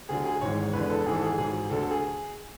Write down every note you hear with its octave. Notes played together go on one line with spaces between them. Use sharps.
D2 D3 F#3 G#4
G#4
G#1 G#2 E3 G#3 C#5
F#1 E2 D3 G#3 B4
A4
G#1 G#2 E3 G#3 G#4
A4
G#4
A1 G#2 F#3 G#4
D2 D3 F#3 A4
A4
G#4